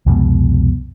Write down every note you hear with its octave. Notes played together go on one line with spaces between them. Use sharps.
C2 F2 B2 G#3